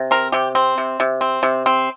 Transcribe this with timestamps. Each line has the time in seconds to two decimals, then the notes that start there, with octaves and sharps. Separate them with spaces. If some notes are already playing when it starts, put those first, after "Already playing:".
Already playing: C3
0.11 C4 A#4
0.32 C3 G4
0.55 C4
0.78 C3
1.00 C3
1.21 C4
1.43 C3
1.66 C4